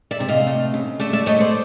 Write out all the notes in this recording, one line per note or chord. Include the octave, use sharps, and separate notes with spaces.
D5 E5
C3
D#5 F5
A3
C#3
A3 D5 E5
D5 E5
A3 C#5 D#5
C5 D5